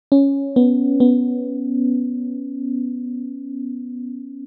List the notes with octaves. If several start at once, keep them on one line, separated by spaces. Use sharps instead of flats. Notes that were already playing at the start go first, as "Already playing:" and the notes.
C#4
B3
B3